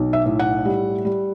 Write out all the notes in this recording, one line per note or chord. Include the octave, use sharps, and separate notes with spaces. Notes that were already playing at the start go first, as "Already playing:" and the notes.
Already playing: B1
E5
A2
F#5
G3
G3